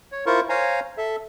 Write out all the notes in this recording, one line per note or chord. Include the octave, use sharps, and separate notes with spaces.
C#5
E4 F4 A#4 C5 C#6
C5 C#5 F5 G#5 A#5
A4 E5